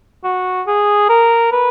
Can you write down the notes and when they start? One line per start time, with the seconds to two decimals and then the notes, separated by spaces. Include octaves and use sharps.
0.24 F#4
0.67 G#4
1.09 A#4
1.52 B4